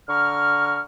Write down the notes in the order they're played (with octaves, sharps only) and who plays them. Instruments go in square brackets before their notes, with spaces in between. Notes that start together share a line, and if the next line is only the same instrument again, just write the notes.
[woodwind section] D3 A#5 C#6 F6